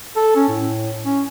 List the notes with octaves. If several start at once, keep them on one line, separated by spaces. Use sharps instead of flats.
A4
C#4
A2
C#4